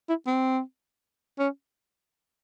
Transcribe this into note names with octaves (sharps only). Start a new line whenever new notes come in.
E4
C4
C#4